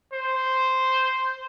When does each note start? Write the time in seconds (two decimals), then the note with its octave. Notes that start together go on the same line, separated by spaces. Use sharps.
0.14 C5